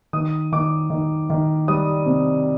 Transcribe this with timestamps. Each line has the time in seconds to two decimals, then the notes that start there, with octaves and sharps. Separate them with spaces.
0.13 D#3 D#6
0.52 D#3 D6
0.90 D#3
1.30 D#3
1.68 G3 D#6
2.06 C3